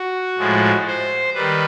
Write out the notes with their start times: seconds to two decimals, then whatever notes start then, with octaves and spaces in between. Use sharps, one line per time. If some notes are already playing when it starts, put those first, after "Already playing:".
Already playing: F#4
0.38 A2 F3 G#3
0.87 C5
1.35 D#3 G3 B4